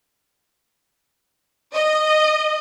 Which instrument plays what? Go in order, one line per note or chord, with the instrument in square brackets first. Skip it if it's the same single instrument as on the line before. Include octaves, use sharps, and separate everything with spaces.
[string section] D#5